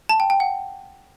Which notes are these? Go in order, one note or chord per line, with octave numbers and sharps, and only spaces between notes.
A5
G5
G5
F#5